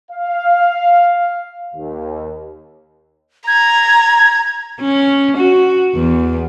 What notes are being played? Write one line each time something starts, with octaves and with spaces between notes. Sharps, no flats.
F5
D#2
A#5 G#6
C#4
F#4
E2